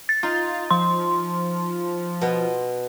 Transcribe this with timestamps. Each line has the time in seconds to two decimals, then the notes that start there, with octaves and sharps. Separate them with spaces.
0.09 A6
0.23 D#4 F4
0.71 F3 C6
2.21 B2 B3